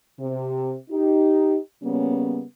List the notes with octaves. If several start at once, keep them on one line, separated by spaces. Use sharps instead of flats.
C3
D#4 G4
C#3 G3 A#3 B3 C#4